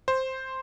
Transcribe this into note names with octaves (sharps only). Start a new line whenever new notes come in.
C5